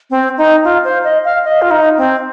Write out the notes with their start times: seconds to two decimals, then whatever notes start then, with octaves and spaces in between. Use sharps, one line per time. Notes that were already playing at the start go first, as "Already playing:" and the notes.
0.10 C4
0.38 D#4
0.64 F4
0.84 C5
1.04 D#5
1.25 F5
1.44 D#5
1.62 F4
1.71 D#4
1.98 C4